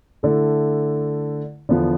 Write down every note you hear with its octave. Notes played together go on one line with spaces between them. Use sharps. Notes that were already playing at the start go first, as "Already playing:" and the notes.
D3 A3 E4 A4
E2 D3 F3 B3